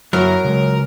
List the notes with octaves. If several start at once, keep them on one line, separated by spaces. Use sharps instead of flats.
F#2 F#3 E4 A#4
C#3 G#3